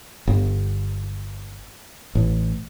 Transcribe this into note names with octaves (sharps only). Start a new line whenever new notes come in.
G1
A1